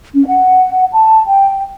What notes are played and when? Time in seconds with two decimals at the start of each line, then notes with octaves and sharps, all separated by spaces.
0.14 C#4
0.26 F#5
0.92 A5
1.27 G5